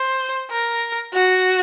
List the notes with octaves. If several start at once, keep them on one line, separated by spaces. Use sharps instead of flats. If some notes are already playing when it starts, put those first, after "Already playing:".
Already playing: C5
A#4
F#4